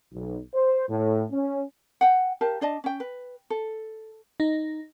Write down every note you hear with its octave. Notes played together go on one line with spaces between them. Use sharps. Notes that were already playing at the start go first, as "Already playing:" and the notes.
B1
C5
A2
C#4
F#5 G5
G4 A#4 F5 A5
D4 D5 D#5 A5
C#4 G5
B4
A4
D#4